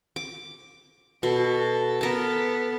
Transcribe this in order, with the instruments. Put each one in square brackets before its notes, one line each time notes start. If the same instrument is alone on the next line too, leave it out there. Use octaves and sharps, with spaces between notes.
[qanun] D6
[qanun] B2 [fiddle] A4
[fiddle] B3 A4 [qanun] A#4 A5